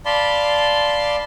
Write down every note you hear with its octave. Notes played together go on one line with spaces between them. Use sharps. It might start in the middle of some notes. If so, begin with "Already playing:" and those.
D5 F5 A5 B5 C6